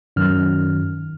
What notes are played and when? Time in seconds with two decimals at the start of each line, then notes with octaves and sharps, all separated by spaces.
0.16 F#2 D#3 F6